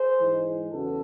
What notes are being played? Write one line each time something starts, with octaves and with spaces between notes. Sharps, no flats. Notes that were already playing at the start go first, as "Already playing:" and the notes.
Already playing: G#4 C5
G#2 E3 G#3
E2 C#3 F#4 A4